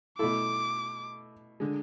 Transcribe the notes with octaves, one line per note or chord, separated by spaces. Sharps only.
B2 A3 E4 A4 D6
D3 G#3